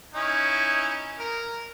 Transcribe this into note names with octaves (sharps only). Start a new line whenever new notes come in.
C#4 D#4 E4
A#4